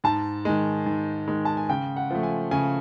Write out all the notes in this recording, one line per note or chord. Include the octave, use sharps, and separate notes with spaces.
G#2 A5
D#3 G#3
G#2
D#3 G#3
A5
G#5
C#3 G5
F#5
F3 A3
G#5
C#3 G#5